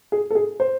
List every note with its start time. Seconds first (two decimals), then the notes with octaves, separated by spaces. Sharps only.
0.12 G#4
0.30 A4
0.35 G#4
0.60 C5